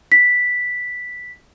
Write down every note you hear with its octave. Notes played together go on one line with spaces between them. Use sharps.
B6